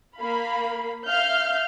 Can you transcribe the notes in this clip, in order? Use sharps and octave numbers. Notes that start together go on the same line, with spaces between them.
A#3 F5 B5
E5 F5 F6 G6